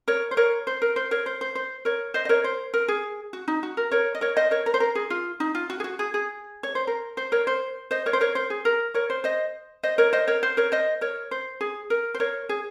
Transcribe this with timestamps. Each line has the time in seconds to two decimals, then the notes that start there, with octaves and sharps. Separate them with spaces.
0.08 A#4 C#5
0.31 C5
0.37 A#4 C#5
0.67 C5
0.82 A#4
0.96 C5
1.11 A#4 C#5
1.26 C5
1.41 C5
1.55 C5
1.85 A#4 C#5
2.14 C5 D#5
2.25 D#5
2.29 A#4 C#5
2.44 C5
2.74 A#4
2.88 G#4
3.33 F#4
3.48 D#4
3.63 F#4
3.77 A#4
3.91 A#4 C#5
4.15 D#5
4.21 A#4 C#5
4.36 C5 D#5
4.51 A#4 C#5
4.66 A#4
4.74 C5
4.80 A#4
4.95 G#4
5.10 F4
5.40 D#4
5.55 F4
5.70 F#4
5.80 G#4
5.84 F#4
5.99 G#4
6.14 G#4
6.63 C#5
6.75 C5
6.87 A#4
7.17 C5
7.32 A#4 C#5
7.47 C5
7.91 C5 D#5
8.06 A#4 C#5
8.13 C5
8.21 A#4 C#5
8.35 C5
8.50 G#4
8.65 A#4
8.94 A#4 C#5
9.10 C5
9.24 C5 D#5
9.83 C5 D#5
9.98 A#4 C#5
10.13 C5 D#5
10.27 A#4 C#5
10.43 C5
10.57 A#4 C#5
10.72 C5 D#5
11.01 A#4 C#5
11.31 C5
11.61 G#4
11.90 A#4
12.14 C5
12.20 A#4 C#5
12.49 G#4